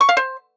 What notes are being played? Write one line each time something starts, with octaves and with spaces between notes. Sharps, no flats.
C#6
F5
C5